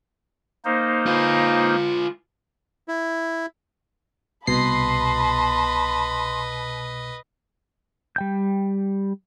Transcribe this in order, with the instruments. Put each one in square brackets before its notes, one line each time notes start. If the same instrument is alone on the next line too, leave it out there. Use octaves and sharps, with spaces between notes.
[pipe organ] A#3 D#4 C5
[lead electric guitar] F4 B4
[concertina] E4
[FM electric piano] C2 B2 C7 [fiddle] B4 D#5 [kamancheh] A5 B5 [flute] C6
[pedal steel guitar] G3 G5 G6